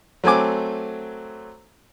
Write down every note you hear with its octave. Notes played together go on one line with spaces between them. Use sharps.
F#3 A3 C4 G#5 D6